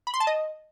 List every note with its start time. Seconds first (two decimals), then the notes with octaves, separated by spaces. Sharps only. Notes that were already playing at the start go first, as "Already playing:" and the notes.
0.07 B5
0.14 C6
0.20 A5
0.27 D#5